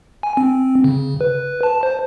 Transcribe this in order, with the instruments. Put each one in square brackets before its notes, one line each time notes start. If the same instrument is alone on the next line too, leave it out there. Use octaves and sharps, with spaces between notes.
[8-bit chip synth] G#5
C4
C#3
B4
A5
C5